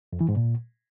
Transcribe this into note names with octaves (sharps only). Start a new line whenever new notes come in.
F2
E3
G#2
A#2